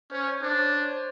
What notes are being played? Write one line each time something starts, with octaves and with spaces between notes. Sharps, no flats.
C#4 C5
C#5
D4 C5
C#5
C#5
C5
C#5
C5